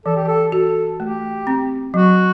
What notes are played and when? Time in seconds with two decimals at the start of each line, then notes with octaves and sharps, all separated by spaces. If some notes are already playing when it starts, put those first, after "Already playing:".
0.06 E3 A4
0.16 G4
0.27 A4
0.52 F#4 A4
1.00 A3 G4
1.47 C4
1.94 F#3 F#4